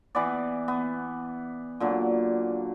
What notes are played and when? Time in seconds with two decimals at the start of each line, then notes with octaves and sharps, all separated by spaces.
0.15 E3 B3 D5
0.68 B3
1.80 A#2 D3 F#3